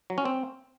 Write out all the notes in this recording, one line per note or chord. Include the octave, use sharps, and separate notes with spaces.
F#3
C#4
C4